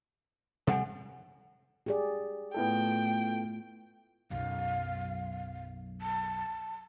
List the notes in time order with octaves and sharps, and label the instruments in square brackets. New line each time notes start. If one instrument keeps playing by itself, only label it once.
[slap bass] C3 G3 C4 [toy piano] A4 F#5 G#5
[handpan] G4 G#4 D5
[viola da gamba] A2 A3 F4 [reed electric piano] B3 E4 A4 [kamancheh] G5
[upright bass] B1 F#2 [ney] F5
[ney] A5